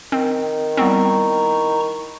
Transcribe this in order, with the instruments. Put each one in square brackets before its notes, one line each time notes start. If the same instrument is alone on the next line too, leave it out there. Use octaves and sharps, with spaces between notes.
[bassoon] D#3 [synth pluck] C4
[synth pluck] G3 B3 C4 [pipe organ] E4 A#5 C#6